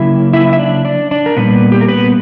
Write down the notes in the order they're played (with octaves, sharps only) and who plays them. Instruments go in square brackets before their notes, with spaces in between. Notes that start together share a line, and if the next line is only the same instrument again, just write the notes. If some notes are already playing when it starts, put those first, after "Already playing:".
Already playing: [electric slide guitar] C#3 F#3 A#3 C#4 E4 E5
E4 E5
E5
D4 D5
D4 D5
D4 D5
A#4
A#2 G3 A#3 B3 B4
G4
A#4
B3 B4